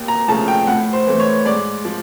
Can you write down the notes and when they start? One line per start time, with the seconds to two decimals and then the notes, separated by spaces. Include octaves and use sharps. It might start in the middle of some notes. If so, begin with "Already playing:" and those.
Already playing: D#2
0.08 A#5
0.28 C#3 F3 A3 A5
0.48 G5
0.67 A2 F#5
0.93 C5
1.07 E3 A3
1.20 C#5
1.45 G#2 D5
1.85 F3